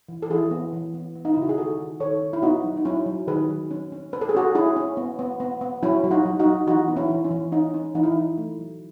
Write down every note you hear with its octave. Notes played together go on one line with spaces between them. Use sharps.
E3
A4
E3 E4 G#4
B3
E3
B3
B3
D#4
E4
C#3
F#4
G#4
D#3 F#4 A4
D#3
D#3 A4 C#5
C#4
E4
B3 D#4 F#4
F#3
D#4
F#3 C#4 E4
F#3
D#3 G#4 B4
F#3
C#4
C#4
C#4 B4
A4
G#4
C#4 F#4 A4
C#4 E4 G#4
C#4
B3
B3
B3
B3
F#3 C#4 E4
F#3
D#4 F#4
F#3
D#4 F#4
F#3
E3 D#4 F#4
B3
C#4 E4
E3
C#4
E3
C#4 D#4
C#4
E3 D#4
E4
D#4
E3
A3
F#3